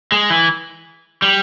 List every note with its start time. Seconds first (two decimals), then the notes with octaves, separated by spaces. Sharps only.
0.12 G#3
0.30 E3
1.22 G3